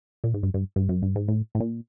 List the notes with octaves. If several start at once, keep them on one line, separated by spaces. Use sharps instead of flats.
A#2
G#2
G2
G2
G2
F#2
G2
G#2
A2
A2
A#2